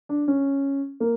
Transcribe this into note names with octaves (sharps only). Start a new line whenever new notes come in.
D4
C#4
A#3